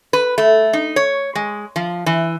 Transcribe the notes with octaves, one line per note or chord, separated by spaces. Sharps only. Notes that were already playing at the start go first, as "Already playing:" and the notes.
B4
A3
D#4
C#5
G#3
F3
E3